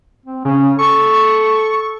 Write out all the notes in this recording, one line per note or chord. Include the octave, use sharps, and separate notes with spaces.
C4
C#3 C#4
A4 C#6